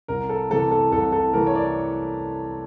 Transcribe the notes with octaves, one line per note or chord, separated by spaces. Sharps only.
C2 A#4
A4
C3 E3 A3 A4
A4
C2 A4
A4
C3 E3 A3 A#4
C#5
D5